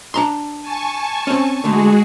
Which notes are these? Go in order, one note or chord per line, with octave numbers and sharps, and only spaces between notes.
D4 A#5 C6
G#5 A5 C#6
C4 C#4
D3 G#3 A3 F#4 G#4